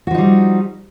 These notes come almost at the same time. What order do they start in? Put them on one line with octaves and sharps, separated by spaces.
F#4 F3 D#4 G3